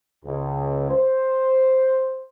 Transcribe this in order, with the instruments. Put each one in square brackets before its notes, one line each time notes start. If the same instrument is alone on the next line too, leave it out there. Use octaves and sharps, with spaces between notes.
[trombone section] C#2
C5